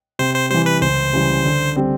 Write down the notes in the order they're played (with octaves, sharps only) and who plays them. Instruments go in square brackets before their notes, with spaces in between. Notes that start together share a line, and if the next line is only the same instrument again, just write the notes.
[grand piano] C3 [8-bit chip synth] C5
[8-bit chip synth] C5
[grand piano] E3 G3 [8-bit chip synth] C5
[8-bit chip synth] B4
[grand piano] C#2 [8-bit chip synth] C5
[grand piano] C#3 E3 G3
D3
G3 C4